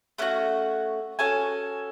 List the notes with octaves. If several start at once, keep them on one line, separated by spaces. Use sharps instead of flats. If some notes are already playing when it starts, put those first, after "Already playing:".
A3 C#4 F#4 F#5
C#4 F#4 A4 G#5